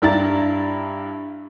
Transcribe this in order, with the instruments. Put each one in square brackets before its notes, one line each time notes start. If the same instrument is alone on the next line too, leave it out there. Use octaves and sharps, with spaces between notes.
[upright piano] G2 D4 E4 G4 A#5 A6